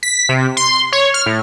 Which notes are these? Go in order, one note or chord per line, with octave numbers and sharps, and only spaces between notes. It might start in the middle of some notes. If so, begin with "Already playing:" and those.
B6
C3
C6
C#5
F6
A2